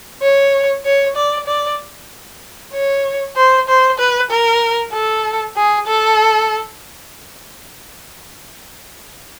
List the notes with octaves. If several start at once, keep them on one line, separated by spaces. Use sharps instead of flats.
C#5
C#5
D5
D5
C#5
C5
C5
B4
A#4
A4
G#4
A4